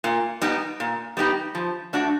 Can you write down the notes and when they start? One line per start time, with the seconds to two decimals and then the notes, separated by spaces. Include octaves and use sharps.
0.04 A#2
0.42 G3 B3 D#4 G4
0.80 A#2
1.17 G3 B3 D#4 G4
1.55 F3
1.93 A3 D4 F#4